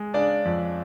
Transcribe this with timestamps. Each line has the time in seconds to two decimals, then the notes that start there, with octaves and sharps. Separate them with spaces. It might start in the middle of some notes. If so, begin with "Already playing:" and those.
Already playing: G#3
0.14 C#3 D4 D5
0.45 F2